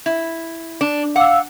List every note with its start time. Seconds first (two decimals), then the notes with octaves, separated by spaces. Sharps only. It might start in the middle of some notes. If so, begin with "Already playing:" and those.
0.06 E4
0.81 D4
1.16 F5 F#5 D6 E6